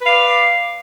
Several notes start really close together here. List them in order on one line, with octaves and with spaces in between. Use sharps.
B4 F5 D5